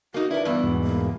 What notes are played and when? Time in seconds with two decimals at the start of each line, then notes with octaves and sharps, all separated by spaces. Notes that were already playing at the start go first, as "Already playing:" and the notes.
0.14 A#3 D#4 F#4
0.31 D4 E4 A#4 B4
0.45 G2 E3 B3
0.64 E2 G#2 B2
0.84 A#3